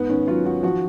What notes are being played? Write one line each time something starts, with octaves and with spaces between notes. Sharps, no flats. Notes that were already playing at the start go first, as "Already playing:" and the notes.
Already playing: G#2 B3
D#3 C#4
F#3 F4
D#3 F#4
F3 F#4